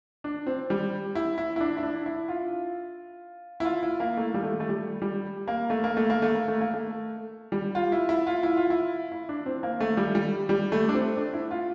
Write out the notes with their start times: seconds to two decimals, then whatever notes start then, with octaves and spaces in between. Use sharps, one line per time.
0.24 D4
0.46 C4
0.70 G3
1.15 E4
1.38 E4
1.56 E4
1.60 D4
1.77 E4
1.83 D4
2.06 E4
2.28 F4
3.60 E4
3.65 F4
3.83 E4
4.00 A#3
4.17 A3
4.34 G3
4.43 A3
4.52 G3
4.60 A3
4.69 G3
5.02 G3
5.48 A#3
5.70 A3
5.84 A#3
5.97 A3
6.10 A#3
6.22 A3
6.35 A#3
6.48 A3
6.61 A#3
6.74 A3
7.52 G3
7.75 F4
7.92 E4
8.09 E4
8.27 F4
8.43 E4
8.57 F4
8.70 E4
9.12 E4
9.29 D4
9.46 C4
9.63 A#3
9.80 A3
9.97 G3
10.15 G3
10.49 G3
10.72 A3
10.89 D4
10.94 C4
11.17 D4
11.33 E4
11.51 F4